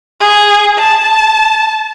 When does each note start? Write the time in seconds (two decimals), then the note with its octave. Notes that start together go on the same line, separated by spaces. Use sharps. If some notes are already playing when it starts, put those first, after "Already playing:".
0.20 G#4
0.77 A5